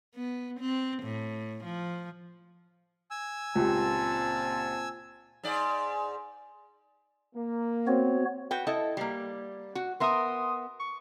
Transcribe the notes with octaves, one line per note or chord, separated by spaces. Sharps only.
B3
C4
A2
F3
G#5 E6
C#2 A#2 C4 G4 A5
G#2 D5
A#3
B3 C4 F#4 C#5
F#4 B4 G5
E4 A4 D#5
G3 A#3
F#4
B3 A#4 E5 C6 D#6
C#6